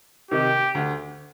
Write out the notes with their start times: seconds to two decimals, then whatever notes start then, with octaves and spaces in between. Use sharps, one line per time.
0.31 C3 D#3 G4
0.75 D2